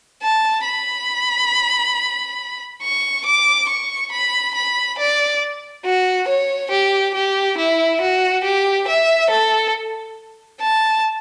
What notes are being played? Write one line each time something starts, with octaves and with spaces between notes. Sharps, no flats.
A5
B5
C#6
D6
C#6
B5
B5
D5
F#4
C#5
G4
G4
E4
F#4
G4
E5
A4
A5